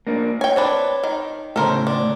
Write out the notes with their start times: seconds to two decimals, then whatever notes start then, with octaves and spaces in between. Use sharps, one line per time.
0.07 A#3 D4
0.41 C#5 G5 G#5
0.56 C4 D4 B4
1.04 D#3
1.56 A2 C#3 A4 A#4 C5
1.87 D4